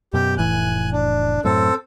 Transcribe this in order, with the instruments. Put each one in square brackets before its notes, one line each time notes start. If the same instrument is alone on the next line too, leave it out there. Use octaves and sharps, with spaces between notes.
[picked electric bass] F#2 B2 [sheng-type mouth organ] G4
[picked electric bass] F1 A2 E3 [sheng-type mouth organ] G#5 F#6
[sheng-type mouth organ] D4
[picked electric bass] F#2 A2 [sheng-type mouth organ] C4 A4